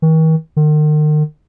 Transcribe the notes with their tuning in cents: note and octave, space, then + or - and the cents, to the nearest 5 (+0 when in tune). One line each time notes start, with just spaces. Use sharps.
D#3 +45
D#3 -40